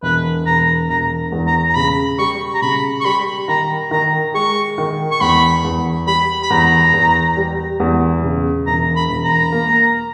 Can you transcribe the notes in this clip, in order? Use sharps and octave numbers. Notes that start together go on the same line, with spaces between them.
E1 B4
E1 A#5
E1 A#5
E2
A#5
A#5
C#3 B5
G3 C#6
A#5
C#3 B5
C#6
G3 B5
D#3 A#5
D#3 A#5
G#3 C#6
D#3
C#6
E2 B5
E2
G3 B5
B5
E2 A#5
E2
G3
E2
C#3
E1 A#5
B5
E1
A#5
A#3